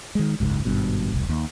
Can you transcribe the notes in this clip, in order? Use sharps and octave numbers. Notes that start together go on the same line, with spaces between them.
D#3 G#3
F#1 C#2 G#2
G#1 G2 B2
E1 C2
D#2